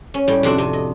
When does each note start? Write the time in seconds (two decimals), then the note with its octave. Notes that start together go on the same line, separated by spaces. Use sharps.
0.14 C#4
0.28 A2 G3
0.43 F2 C3 D4 F#4
0.58 C3
0.73 D#5